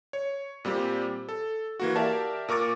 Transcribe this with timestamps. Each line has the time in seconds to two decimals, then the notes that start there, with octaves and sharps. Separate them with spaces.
0.13 C#5
0.65 A#2 G3 C4 G4
1.29 A4
1.80 E3 A#3 F#4
1.95 G4 A#4 D5 E5 F5 A5
2.49 A#2 A#4 C#6 D6 A6